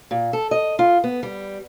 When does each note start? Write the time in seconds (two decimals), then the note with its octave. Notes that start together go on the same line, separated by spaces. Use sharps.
0.11 A#2
0.33 A4
0.51 D#5
0.79 F4
1.04 B3
1.23 G3